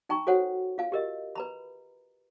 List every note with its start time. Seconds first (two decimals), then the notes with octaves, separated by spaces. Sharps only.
0.09 D#4 G5 A#5 C#6
0.27 F#4 A4 C5 C#5 F#5 G#5
0.78 F4 F5 G#5
0.92 G4 A#4 D#5
1.35 B4 A#5 B5